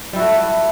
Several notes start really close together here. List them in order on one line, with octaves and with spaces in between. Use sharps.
G3 E4 F#4 A3